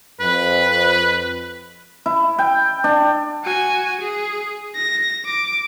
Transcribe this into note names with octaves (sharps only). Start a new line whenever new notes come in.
F2 B4
E4
G5
D4
F#4 G#5
G#4
A#6
D6